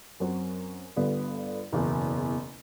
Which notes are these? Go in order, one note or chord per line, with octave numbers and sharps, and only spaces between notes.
F#2 F#3 C4 F#4
G1 G2 D3 G3 B3
F#1 E2 B2